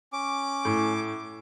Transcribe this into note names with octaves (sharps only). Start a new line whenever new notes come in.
C#4 D6
A2